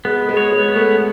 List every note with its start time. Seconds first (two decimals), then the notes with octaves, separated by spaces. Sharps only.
0.05 G#3 B3
0.29 G#3
0.37 C#5
0.52 G#3
0.68 B3
0.76 A3